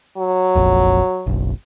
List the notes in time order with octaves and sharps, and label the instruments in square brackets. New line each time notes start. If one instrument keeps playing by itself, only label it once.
[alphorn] F#3
[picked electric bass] F1 A#1 F2
F#1 B1